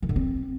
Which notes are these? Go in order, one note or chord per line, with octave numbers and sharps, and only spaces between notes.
D#3
D3
C4